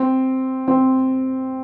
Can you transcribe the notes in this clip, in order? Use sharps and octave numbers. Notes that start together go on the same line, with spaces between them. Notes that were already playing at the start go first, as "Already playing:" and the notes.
Already playing: C4
C4